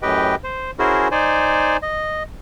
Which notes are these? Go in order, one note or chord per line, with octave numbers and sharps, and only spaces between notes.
F#2 A2 G4 B4 D#5 G5
C5
C#4 E4 F#4 G#4 A#4 C5
D#4 C5 D5 G#5
D#5